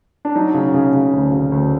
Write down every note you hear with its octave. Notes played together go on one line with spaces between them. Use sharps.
D4
F#3 D#4
C#3
C#3
C#3
D2
C#3
D2